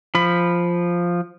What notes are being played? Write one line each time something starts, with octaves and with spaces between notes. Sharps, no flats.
F3 B5